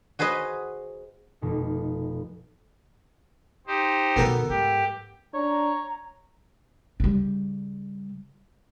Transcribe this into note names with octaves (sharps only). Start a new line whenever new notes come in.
F#4 G#4 B4 C5 D#5
F1 B2 D#4
D#4 G4 C5
B2 D#3 B3 A4 A#4
G#2 G4
D4 C#5 A#5
C#3 G3